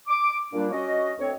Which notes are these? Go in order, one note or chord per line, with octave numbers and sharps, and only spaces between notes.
D6
A#2 G3 A#3 D4
C#4 F#4 D#5
D2 C4 C#5